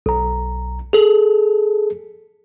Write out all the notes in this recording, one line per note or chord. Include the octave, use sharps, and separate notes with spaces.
B1 A#5
G#4 A4